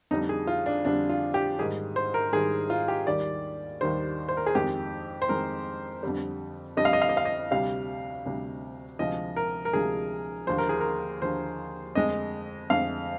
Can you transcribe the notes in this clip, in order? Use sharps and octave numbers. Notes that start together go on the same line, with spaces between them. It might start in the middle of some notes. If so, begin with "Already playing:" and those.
F2 D3 G3 D#4
G#4
F4
D4
F2 D3 G3 D4
F4
G4
G#2 D#3 G3 G#4
C5
A#4
G#2 D#3 G3 G#4
F4
G4
D#2 D#3 G3 D5
D#2 D#3 G3 C5
C5
A#4
G#4
F2 D#3 G#3 G4
C5
F2 D#3 G#3 A#4
F2 D3 G3
F2 D3 G3 D#5
F5
D#5
F5
D#5
F5
D#5
D2 C3 G3 F5
D2 C3 G3
D2 C3 F3 G#3 D#5
A#4
A#4
D2 C3 F3 G#3 G#4
D#2 D3 F3 C5
A#4
G#4
A#4
D#2 D3 F3 C5
F2 D3 G#3 D#5
F2 D3 G#3 F5